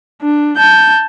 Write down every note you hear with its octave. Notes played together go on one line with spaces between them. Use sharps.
D4
A5 G6